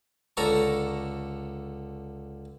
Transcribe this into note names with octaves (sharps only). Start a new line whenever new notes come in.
C#2 D3 A4 A#5 C#6